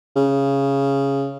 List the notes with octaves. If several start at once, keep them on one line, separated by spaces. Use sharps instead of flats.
C#3